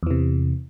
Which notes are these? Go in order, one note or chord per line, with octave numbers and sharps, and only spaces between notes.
E2 C3 E3